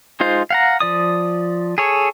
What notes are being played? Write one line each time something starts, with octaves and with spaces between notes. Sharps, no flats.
G#3 D#4 F4 C5
F5 F#5 A#5
F3 D5 D#6
G#4 A4 C#5